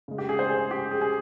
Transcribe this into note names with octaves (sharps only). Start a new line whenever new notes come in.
C#3 G#3
G4
G#4
C5
G#4
G4
G#4
G#4